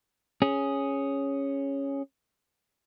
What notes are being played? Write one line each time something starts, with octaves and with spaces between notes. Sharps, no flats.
C#4 G#4